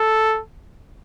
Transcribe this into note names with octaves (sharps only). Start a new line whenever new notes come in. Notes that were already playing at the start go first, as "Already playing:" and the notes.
Already playing: A4